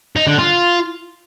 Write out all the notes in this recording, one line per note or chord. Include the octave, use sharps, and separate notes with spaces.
D#4
D3
F4